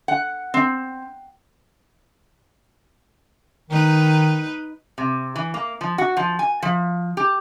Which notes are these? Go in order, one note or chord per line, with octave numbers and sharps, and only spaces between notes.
F#5
C4
D#3 D#4 B4
C3
E3
A#3
F3
F#4
F3
G#5
F3
G4